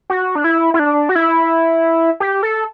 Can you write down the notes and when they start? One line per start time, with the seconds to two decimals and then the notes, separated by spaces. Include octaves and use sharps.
0.10 F#4
0.35 D4
0.44 E4
0.74 E4
0.79 D4
1.09 F#4
1.16 E4
2.20 G4
2.43 A4